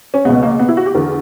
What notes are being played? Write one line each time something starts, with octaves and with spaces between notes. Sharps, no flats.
C#4
C#2 B2 B3
A#3
B3
E4
F#4
G4
E2 D3 A#4